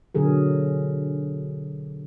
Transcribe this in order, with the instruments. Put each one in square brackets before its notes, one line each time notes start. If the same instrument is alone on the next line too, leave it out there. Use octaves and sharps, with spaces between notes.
[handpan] B2 D3 F#3 G#4 A#4